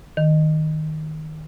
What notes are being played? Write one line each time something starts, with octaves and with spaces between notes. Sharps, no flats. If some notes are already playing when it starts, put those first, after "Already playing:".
D#3